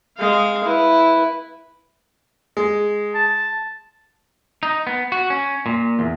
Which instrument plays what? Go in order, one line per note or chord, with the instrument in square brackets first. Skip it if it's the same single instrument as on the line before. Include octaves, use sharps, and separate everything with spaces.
[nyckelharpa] G#3 F5
E4 B4
[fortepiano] G#3
[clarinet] A5
[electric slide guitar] D#4
B3
F#4
C#4
A#2
E2